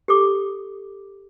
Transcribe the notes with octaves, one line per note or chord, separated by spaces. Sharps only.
G4 A4 D6